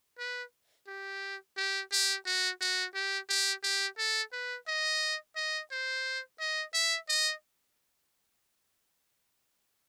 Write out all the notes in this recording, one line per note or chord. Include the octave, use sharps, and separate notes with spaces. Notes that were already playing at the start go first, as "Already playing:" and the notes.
B4
G4
G4
G4
F#4
F#4
G4
G4
G4
A4
B4
D#5
D#5
C5
D#5
E5
D#5